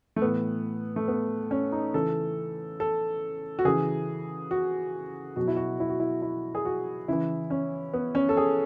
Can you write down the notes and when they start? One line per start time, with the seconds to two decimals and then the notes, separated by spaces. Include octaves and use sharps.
0.16 A3
0.22 A2 E3 B3
0.96 A3
1.08 B3
1.51 C#4
1.72 D#4
1.94 C#3 E3 A4
2.80 A4
3.59 F#4
3.65 C#3 E3 G#4
4.51 F#4
5.36 B2 F#3 F#4
5.47 E4
5.57 F#4
5.80 E4
5.90 F#4
6.00 E4
6.22 E4
6.55 G#4
6.65 F#4
7.08 C#3 E3 E4
7.50 C#4
7.94 B3
8.15 C#4
8.29 A4
8.37 G#4